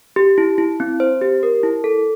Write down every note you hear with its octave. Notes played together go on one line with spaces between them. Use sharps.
G4
E4
E4
C4
C5
G4
A#4
E4
A4